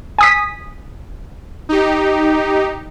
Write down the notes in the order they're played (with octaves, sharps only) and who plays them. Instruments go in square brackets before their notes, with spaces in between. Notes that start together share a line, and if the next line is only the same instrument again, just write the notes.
[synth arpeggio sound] G#5 D#6 B6
[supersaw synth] D#4 G4